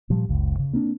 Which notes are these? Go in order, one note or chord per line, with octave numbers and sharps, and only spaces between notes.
A#2 F3 G3
F#1 C#2
C#3
A#3 C4 D4